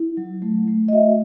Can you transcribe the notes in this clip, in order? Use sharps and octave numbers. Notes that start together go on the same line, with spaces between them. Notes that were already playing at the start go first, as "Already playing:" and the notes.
Already playing: E4
F#3
A3
A3
D#5
F#4 E5